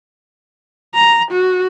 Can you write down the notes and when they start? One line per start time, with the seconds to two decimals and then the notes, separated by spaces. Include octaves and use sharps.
0.94 A#5
1.31 F#4